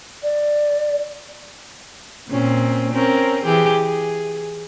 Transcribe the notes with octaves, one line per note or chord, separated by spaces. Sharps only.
D5
A#2 C4 C#4
C4 C#4 A#4
E3 G4 G#4
G#4